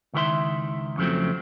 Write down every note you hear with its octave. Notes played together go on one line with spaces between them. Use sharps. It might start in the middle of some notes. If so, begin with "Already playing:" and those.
C#2 D#3 E4 A#4 E5 C6
F2 C#3 F3 F#3 A3 C4